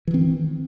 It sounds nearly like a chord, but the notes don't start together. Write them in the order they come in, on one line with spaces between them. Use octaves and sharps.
E3 D#3 C4